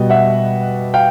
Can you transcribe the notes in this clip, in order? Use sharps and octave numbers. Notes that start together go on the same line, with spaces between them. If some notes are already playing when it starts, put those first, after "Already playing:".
Already playing: B2 G3 B3 D#5
E5 F#5
F5 G5